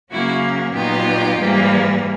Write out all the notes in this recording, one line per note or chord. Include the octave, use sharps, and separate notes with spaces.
C#3 F#3 A#3 C#4 E4 F#4
A#2 F#3 B3 D#4 F4 G4
G#2 E3 G3 A#3